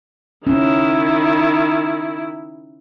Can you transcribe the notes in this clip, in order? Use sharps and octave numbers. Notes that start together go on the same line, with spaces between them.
D#3 C#4 E4